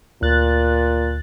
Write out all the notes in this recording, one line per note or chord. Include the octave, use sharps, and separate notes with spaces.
D2 A#2 F#6 A6